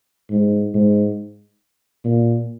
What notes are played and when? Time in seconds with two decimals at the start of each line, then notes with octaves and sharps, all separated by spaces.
0.31 G#2
0.74 G#2
2.05 A#2